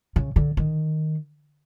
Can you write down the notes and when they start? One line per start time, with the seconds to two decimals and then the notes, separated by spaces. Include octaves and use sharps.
0.16 C#3
0.36 D3
0.57 D#3